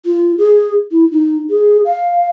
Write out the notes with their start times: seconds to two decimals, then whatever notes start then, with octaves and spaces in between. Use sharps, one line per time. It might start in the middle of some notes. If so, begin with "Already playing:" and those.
0.06 F4
0.38 G#4
0.91 E4
1.12 D#4
1.50 G#4
1.85 F5